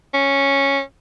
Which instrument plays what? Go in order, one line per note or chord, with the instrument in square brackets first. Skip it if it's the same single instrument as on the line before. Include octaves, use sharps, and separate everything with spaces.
[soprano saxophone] C#4